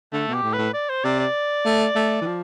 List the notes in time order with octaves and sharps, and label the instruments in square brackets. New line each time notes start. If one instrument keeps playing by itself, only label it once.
[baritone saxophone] D3 [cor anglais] A3
[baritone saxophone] B2
[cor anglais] G4
[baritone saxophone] A2
[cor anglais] B4
[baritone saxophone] A2
[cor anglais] D5
C5
[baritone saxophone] C3 [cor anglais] D5
[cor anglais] D5
[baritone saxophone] A3
A3
E3
F3